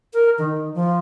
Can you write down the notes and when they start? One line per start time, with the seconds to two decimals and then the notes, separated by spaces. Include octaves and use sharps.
0.14 A#4
0.38 D#3
0.74 F3